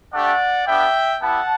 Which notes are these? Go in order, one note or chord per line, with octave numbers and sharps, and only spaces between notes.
A3 D4 G4 D5 F#5
B3 D4 G4 E5 G5
B3 E4 G4 F#5 A5